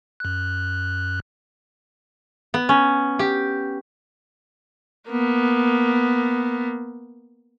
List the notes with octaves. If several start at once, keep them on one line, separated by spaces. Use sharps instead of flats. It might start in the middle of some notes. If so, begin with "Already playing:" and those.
F#2 F#6
B3
C#4
G4
A#3 B3